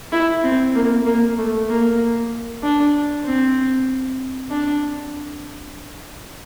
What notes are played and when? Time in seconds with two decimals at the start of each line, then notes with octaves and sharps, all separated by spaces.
0.12 E4
0.44 C4
0.75 A#3
1.06 A#3
1.38 A3
1.69 A#3
2.63 D4
3.25 C4
4.50 D4